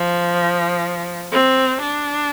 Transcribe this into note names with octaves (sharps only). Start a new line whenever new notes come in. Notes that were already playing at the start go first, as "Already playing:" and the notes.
Already playing: F3
C4
D4